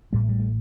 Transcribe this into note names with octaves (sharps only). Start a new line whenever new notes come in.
A1 A2 G3
A3
G3
A3